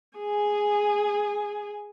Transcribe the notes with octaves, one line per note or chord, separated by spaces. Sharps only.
G#4 G#5